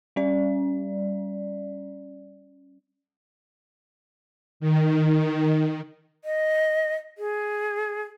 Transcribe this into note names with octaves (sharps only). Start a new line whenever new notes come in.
G3 C#4 D5
D#3
D#5
G#4